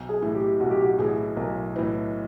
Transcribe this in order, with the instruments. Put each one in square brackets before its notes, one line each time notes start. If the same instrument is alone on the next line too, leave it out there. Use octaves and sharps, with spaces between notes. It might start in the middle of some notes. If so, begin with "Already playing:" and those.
Already playing: [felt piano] B1
[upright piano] G#4
[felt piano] A2 E3
[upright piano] G4
[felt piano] B1 [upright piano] F#4
[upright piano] G4
F#4
[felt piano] A2 E3 [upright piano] G#4
[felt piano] B1 [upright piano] A#4
[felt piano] A2 E3 [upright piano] B4